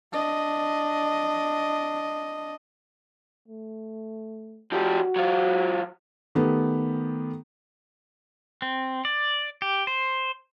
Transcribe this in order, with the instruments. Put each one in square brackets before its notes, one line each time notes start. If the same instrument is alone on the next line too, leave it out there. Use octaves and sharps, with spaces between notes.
[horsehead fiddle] D4 D#5
[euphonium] A3
[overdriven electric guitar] F3 G4 [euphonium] F#4
[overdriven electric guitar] F#3 F4
[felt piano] D#3 A3 B3 G4
[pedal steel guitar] C4
D5
G4
C5